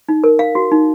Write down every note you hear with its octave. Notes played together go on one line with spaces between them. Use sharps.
D#4
A#4
F5
F#4
D#4